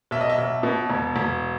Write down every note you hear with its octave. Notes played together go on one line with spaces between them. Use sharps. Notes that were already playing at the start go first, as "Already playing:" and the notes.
B1 E5
D#5
E5
B1
B2
E1
E1